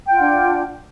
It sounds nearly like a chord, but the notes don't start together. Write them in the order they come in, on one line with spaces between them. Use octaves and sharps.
G5 F4 F#5 D4